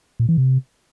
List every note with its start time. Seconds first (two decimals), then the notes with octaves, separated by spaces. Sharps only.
0.20 A#2
0.29 E3
0.38 C3